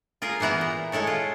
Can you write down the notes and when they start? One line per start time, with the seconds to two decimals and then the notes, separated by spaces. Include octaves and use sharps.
0.22 F4 G#4 A#4
0.40 A#2 E3 B3 E4 A#5
0.61 A#2
0.92 G#3 E4 A4 C#5
1.07 F4